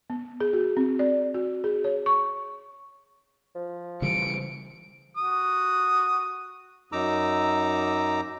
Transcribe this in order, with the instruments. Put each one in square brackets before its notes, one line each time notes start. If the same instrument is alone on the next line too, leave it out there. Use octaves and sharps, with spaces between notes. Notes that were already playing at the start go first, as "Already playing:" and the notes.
[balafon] B3
G#4
F#4
C4
D5
F#4
G#4
C#5
C#6
[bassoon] F3
[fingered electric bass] C#3 E3 G3 [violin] C#7 D7
[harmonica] F#4 D#6
[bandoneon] F#2 D#4 A#5 D6 E6